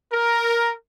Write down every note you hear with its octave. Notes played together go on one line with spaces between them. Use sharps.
A#4